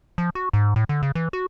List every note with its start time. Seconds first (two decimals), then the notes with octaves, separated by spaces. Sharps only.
0.18 F3
0.35 F#4
0.53 G#2
0.76 A2
0.89 D3
1.03 C#3
1.15 E3
1.33 F#4